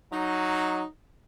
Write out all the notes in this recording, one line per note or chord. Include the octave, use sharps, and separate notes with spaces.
F#3 D#4